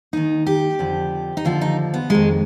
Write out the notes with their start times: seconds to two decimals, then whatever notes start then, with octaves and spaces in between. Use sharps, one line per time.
0.13 D#2 D#3 D#4
0.47 G4
0.79 F2 D3 F3
1.37 D#4
1.45 D#2 D3 F3 F4
1.61 D#4
1.94 B3
2.10 F2 D#3 G#3